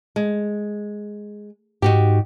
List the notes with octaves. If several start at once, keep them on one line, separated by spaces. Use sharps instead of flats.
G#3
G#2 D#4 F#4 G4